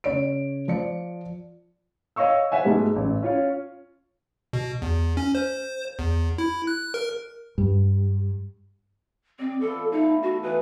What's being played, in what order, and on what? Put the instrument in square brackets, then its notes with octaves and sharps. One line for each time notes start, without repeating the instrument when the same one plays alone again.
[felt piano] C#3 C#5 D7
F3 D5 C#7
[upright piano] C#5 D#5 F5 C#6 E6
C5 E5 F#5 G#5
G#2 B2 G#3 A3
A1
C#4 F4 C#5
[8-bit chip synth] B2
E2
C#4
C5
E2
E4
F#6
A#4
[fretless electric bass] G2
[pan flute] C4 [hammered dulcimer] D5 D#5 D6
[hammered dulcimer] F3 B3 [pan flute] A4
[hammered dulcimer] A3 E4 F#4 [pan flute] D#4
[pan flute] F#4 [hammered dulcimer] A4 F5
[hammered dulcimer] E3 D#5 [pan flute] B4